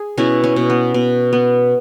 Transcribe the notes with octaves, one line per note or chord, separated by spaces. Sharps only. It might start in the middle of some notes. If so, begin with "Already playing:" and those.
Already playing: G#4
B2 C#4 E4
C#4
B2
B3
B2
B3